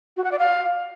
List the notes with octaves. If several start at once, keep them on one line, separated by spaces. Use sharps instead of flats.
F#4
F#5
D5
F5